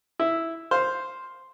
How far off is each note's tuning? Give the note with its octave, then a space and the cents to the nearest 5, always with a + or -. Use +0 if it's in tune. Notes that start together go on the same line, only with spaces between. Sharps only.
E4 -5 E5 +0
C5 +0 F5 +0